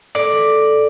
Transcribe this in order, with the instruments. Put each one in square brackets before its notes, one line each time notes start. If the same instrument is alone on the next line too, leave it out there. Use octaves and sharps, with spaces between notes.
[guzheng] A2 [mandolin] D5
[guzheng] E3